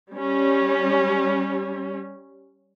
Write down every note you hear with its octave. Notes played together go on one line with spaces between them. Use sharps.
G3 C#4